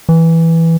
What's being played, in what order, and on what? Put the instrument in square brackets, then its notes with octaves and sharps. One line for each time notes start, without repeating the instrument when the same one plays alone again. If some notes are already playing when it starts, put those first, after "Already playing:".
[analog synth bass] E3